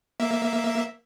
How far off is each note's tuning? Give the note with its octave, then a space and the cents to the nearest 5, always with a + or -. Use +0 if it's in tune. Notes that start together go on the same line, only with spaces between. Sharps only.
A#3 +0 E5 +0